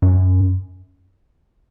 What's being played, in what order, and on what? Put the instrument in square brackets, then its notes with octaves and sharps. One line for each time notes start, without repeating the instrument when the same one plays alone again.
[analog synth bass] F#2